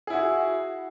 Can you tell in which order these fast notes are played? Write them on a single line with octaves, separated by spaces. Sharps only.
G#4 E4 F#4